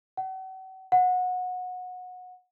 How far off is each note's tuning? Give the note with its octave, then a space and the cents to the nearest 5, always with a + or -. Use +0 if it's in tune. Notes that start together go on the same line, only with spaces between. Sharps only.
F#5 +40
F#5 -25